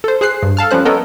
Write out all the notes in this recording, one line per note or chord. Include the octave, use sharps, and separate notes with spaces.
A4 C5
G#4 C5 F#6 C7
G2
A4 F5 A5 F6
F3 G3 C#4 C5 F#6
B3 A4 A#4 C#5 D#5